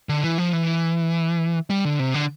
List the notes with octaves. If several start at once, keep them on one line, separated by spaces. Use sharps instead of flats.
D3
E3
F3
E3
G3
D3
C3
D3